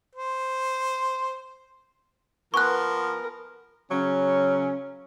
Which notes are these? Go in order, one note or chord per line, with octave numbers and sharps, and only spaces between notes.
C5
F3 B3 A#4 G#5 C#6 F#6
C#3 F#3 C#4